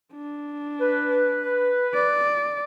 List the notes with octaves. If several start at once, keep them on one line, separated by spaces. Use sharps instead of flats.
D4
B4
D5